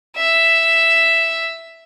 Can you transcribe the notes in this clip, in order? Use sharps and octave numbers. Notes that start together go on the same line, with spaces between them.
E5